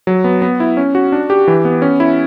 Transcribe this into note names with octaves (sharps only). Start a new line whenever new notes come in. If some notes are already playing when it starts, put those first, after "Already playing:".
F#3
B3
B3
E4
C#4
F#4
D4
G4
E3
B3
C#4
E4